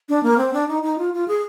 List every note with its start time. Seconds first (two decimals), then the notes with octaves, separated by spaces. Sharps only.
0.09 D4
0.23 A#3
0.38 C4
0.53 D4
0.68 D#4
0.83 D#4
0.98 F4
1.14 F4
1.28 G#4